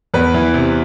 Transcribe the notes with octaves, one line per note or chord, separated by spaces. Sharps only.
E2 B4
E3
C3